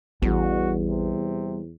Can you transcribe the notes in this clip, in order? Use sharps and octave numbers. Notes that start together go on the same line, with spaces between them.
A1 E2 G3 F#4
C3